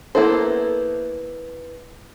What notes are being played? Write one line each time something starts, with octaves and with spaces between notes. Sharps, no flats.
A#3 B3 E4 A4 C5